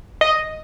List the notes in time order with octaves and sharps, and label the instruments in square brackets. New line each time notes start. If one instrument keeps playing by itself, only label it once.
[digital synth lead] D#5